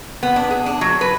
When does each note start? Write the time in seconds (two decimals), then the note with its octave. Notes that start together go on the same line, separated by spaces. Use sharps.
0.23 B3
0.36 D4
0.51 G#4
0.66 D4
0.81 F#3
1.01 B4